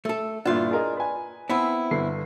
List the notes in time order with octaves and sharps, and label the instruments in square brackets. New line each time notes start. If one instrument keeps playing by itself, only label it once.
[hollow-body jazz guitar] A3 A4
[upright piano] G1 A#2 E4 [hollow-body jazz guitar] D4 F4
[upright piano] G#4 A#4 D#5
B4 G#5
[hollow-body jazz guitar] B3 C4 E4
[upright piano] G1 D3 C7